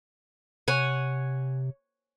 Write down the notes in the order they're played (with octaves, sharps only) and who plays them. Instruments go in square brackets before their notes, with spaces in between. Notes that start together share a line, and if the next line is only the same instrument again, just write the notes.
[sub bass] C3 [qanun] C#5 F#5 G#5